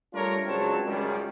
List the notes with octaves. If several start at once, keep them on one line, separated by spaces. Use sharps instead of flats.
G3 A3 D4 F4 A#4 C#5
C#2 F#3 C4 D4 C#5 A5
C#2 F#2 D#3 G3